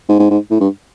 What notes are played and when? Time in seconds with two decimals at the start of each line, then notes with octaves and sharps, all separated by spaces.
0.09 G#2
0.20 G#2
0.31 G#2
0.51 A2
0.61 G2